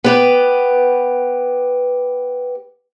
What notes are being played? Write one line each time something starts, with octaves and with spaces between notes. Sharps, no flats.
B3 G4 B4